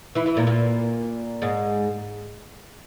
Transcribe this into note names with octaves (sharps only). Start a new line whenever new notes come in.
E3 E4
E3 E4
A#2 A#3
A#2 A#3
G#2 G#3